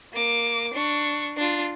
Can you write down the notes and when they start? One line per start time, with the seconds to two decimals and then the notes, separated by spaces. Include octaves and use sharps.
0.13 A#3 D6
0.74 D4 C#6
1.37 D4 F4